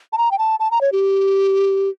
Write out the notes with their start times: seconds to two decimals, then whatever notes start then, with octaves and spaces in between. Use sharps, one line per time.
0.13 A5
0.18 A#5
0.31 G5
0.39 A5
0.60 A5
0.71 A#5
0.81 C#5
0.92 G4